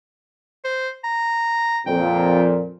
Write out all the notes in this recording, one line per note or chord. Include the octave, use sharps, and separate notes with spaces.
C5
A#5
F2 A#2 G5